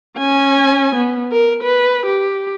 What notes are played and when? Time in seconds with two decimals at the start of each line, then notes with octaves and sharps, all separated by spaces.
0.18 C#4 G#5
0.95 B3
1.32 A#4
1.63 B4
2.06 G4